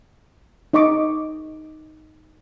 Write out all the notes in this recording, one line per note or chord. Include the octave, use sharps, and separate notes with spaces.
D#4 D#5 C#6 D6